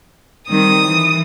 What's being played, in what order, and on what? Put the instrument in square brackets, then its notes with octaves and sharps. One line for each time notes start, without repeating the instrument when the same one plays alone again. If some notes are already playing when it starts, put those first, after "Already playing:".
[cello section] D#3 G3 C4 [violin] D#6
[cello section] E3